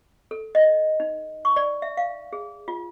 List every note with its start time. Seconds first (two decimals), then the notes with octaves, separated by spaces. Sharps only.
0.31 A4
0.55 D#5
1.00 D#4
1.45 C#6
1.56 D5
1.82 E5
1.97 F5
2.33 G#4
2.68 F4